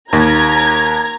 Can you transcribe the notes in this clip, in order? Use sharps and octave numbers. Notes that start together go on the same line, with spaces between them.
D#2 A#5 G#6